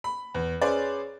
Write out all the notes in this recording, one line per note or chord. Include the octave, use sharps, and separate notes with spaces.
B5
E2
C#4 G#4 B4 C5 D5